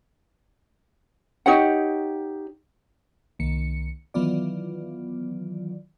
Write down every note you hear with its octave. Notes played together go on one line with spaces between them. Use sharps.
D#4 G4 C#5 F#5
C2 D#3 A#3 C#7
D#3 E3 F#3 B3 F4 D5